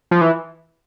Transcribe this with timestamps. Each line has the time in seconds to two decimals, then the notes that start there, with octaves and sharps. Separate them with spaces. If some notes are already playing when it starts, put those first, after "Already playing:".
0.11 F3
0.21 E3